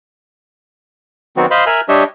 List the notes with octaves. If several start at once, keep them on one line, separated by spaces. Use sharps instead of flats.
D#3 F#3 B3 C4 F#4
C5 D#5 F5 B5 C6
A#4 E5 G#5 F6 F#6
G3 D4 G4 C#5 D#5 E5